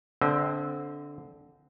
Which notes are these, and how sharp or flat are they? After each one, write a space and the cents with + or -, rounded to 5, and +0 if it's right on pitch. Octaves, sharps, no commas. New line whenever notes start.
D3 -15 C4 +0 D#5 +45